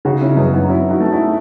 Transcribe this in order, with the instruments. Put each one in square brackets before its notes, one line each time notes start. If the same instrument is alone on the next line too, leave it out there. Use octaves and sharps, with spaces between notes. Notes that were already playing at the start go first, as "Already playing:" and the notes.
[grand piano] C#3 [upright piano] D#4 F#4
[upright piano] C#4 E4
[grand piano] F#2 [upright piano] B3 D#4
[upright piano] B3 D#4
[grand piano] F#3 [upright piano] C#4 E4
[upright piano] D#4 F#4
[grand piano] A3
[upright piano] E4 G#4